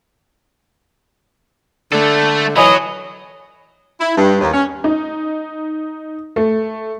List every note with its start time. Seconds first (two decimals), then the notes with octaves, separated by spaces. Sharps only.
1.92 D3 A3 A4
2.56 E3 F#3 C#5 D#5 G#5 B5
4.00 E4
4.17 G2
4.41 D#2
4.54 C#4
4.84 D#4
6.36 A3